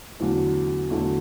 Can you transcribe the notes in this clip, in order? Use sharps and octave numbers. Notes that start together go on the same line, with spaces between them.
E2 D3 F#3 A3
E2 D3 F#3 A3